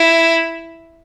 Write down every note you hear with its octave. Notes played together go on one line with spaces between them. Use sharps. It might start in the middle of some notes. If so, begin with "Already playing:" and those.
Already playing: E4